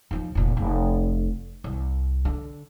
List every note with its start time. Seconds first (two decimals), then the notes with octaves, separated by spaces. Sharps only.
0.11 D#2 F3
0.35 F1 A#2
0.57 F1
1.64 C2
2.25 D3